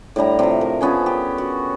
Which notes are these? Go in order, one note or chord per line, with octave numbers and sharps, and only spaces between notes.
A2 D3 G3 A#5
C3 F3
A#4
F3 B3 C#4 G#4
G4
F#4